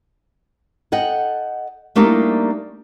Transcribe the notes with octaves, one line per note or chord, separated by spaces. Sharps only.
A4 D#5 F#5 G5
G3 A3 A#3 D4 D#4 G4